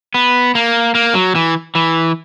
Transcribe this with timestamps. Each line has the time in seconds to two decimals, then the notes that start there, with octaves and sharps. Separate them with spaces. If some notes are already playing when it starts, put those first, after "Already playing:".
0.14 B3
0.55 A#3
0.95 A#3
1.14 F#3
1.35 E3
1.75 E3